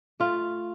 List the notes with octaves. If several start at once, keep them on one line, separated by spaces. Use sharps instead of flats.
A3 F4